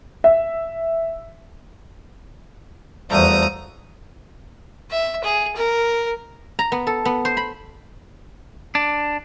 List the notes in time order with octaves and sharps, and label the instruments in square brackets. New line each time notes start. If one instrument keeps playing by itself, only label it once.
[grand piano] E5
[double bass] E2 G3 [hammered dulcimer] F3 A3 F#4 [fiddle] A#5 D#6
[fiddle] E5
G#4
A#4
[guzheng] A#5
B3
A4
B3
C5
B5
[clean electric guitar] D4